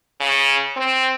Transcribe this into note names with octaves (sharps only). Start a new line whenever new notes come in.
C#3
C4